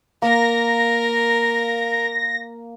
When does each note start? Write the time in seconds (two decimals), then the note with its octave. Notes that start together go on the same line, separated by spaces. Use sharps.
0.22 A#3 A#4 A#6